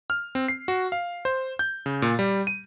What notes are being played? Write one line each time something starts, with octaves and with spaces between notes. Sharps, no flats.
F6
C4
C7
F#4
F5
C5
G6
C#3
A#2
G3
D#7